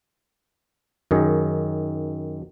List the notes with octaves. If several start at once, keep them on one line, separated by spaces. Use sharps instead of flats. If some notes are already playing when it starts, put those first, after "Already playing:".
F#2 D#3 G#4